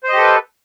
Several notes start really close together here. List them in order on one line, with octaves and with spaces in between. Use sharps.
C5 D#5 G4 A4 B4